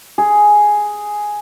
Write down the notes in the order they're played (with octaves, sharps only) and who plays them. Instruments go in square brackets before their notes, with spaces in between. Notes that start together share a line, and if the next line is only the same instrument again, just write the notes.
[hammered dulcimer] G#4